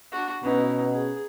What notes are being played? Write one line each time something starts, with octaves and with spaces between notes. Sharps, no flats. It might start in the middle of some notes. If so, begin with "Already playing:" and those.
D4 F#4
B2 C#4 D#4 E4 B4
G#4